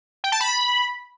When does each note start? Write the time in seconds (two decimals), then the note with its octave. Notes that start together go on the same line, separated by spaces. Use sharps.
0.24 G5
0.32 A5
0.41 B5